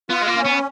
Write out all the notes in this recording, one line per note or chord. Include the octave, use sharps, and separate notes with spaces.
B3 F4
G#3
A#3
C#4
B3